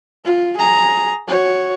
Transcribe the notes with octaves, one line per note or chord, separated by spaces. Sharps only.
F4
G#4 A#5
F#4 C#5